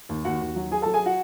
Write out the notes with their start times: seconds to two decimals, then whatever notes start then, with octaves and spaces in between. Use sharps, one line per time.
0.09 D#2
0.25 D#2 F#4 F#5
0.41 D#2
0.56 F#3
0.71 F#3 G#4 G#5
0.82 F#3 A4 A5
0.94 G#4 G#5
1.06 F#4 F#5